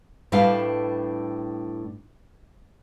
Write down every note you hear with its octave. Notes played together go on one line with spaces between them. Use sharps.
A2 G3 D4 A4 B4 F5